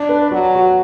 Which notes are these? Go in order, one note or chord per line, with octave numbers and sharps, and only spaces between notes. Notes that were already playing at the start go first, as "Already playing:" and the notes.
Already playing: D4
B4
F#3 F#4
F#4